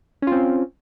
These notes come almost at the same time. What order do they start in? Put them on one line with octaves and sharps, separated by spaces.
C#4 F4 C4